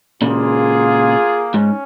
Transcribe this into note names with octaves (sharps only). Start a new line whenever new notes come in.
A#2 C#3 A#3 F4 G#4
G#2 C#4